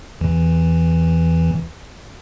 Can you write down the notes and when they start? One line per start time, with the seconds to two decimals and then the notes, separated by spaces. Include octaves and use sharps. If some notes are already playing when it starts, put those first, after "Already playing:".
0.21 E2 E3